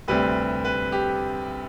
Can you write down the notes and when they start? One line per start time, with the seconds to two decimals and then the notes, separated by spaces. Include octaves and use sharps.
0.08 D2 C3 G3 C4 B4
0.65 B4
0.92 G4